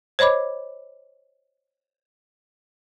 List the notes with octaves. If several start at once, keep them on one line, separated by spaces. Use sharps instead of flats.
C5 C#5 D#5 B5 D6